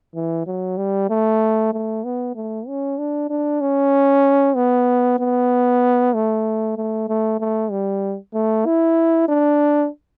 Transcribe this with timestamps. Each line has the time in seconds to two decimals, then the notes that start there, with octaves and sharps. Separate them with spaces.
0.15 E3
0.47 F#3
0.77 G3
1.10 A3
1.73 A3
2.04 B3
2.36 A3
2.67 C#4
2.98 D4
3.30 D4
3.61 C#4
4.55 B3
5.19 B3
6.14 A3
6.77 A3
7.09 A3
7.40 A3
7.71 G3
8.34 A3
8.66 E4
9.28 D4